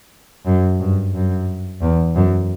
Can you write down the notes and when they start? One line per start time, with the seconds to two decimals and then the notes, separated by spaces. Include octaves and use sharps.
0.46 F#2
0.80 G2
1.14 F#2
1.82 E2
2.15 F#2